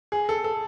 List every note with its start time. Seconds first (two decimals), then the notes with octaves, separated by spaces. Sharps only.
0.12 G#4
0.29 A4
0.44 A4